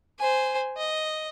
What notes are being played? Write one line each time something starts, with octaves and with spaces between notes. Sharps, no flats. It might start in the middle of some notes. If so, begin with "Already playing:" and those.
C5 G#5
D#5